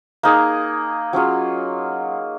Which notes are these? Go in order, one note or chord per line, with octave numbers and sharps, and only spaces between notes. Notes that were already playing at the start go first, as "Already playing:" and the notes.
A#3 D#4 G#4
F#3 C#4 F4 G#4